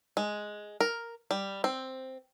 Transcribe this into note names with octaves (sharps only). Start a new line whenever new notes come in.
G#3
A#4
G3
C4